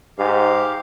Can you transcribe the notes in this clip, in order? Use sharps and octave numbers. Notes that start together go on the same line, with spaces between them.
G#2 G4 F5